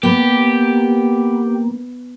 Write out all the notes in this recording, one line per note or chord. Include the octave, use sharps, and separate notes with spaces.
A#3 B3 G4